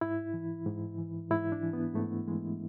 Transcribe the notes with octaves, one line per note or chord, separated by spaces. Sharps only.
G#2 E4
E3
G#2
E3
G#2 E4
D4
E3
B3
G#2 A3
E3 G#3